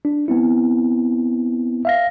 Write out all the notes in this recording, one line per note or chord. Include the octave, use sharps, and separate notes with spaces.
D4
B3 C4 E4
E5 F5 A#6